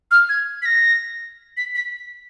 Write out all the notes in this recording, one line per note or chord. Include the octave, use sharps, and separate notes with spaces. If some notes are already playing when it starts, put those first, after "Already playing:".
F6
G#6
B6
A#6
B6
B6